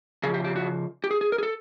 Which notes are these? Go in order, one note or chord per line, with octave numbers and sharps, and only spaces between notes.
C#3 F3 G#4
G4
G4
F#4
G4
G#4
G#4
A#4
G#4
A4